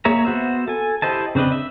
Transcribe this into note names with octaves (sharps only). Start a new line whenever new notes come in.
A#3 G#4 C#5 E5 A#5
B3 F#4 C5 E5
A4 G#5
E4 G4 C5 D#5 A5
C#3 C4 D4 B4 D#5
E5